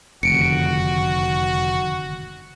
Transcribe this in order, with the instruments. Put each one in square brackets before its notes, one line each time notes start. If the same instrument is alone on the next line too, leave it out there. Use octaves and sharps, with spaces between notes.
[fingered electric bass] F1 [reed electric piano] F#2 D3 D#3 [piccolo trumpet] F#4 [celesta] C#7 D7